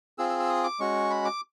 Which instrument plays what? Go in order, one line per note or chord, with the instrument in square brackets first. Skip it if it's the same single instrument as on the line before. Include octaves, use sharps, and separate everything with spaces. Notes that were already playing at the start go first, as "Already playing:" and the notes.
[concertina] C4 F4 G#4 E6
E6
E6
D#6
D6
G#3 C#4 F#4 C#6
B5
D6